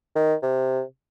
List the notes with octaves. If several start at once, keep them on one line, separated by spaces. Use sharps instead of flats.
D#3
C3